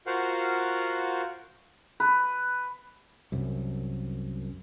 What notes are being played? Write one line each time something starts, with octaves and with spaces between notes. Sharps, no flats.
F4 F#4 A#4 C5 F5 F#5
B4
C2 F#2